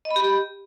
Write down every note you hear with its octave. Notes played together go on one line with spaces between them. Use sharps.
D#5
B5
G4